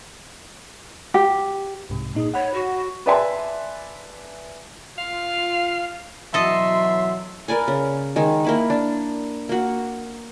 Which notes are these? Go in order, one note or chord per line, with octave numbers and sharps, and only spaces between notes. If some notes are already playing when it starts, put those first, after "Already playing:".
G4
C2 G#2 C3
A#2 D#4 G#4
C#5 F#5 B5
F#4
B4 D5 E5 G#5 A5 C6
F4 F5
B2 E3 F#3 A4 D#5 E5 C6
A#4 B4 D5 G#5
C#3
D#3 G#3
A#3 E4 B4
D4
A#3 F#4